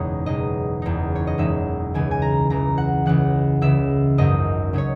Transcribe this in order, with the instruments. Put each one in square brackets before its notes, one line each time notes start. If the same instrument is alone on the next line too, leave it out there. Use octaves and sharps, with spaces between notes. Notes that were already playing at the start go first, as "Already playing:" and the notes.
Already playing: [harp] F#1 E2 B2 G#3 D#4 C#5
F#1 E2 B2 G#3 D#4 D#5
F#1 E2 B2 G#3 D#4
C#5
D#5
F#1 E2 B2 G#3 D#4 E5
C#2 C#3 E3 G#5
G#5
A#5
C#2 C#3 E3 A#5
F#5
C#2 C#3 E3 F#5
C#2 C#3 E3 E5
G#1 F#2 C#3 F#3 C#4 D#5
C#3 F#3 C#4 C#5